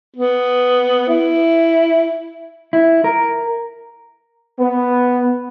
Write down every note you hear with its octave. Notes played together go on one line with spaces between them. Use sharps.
B3
E4
E4
A#4
B3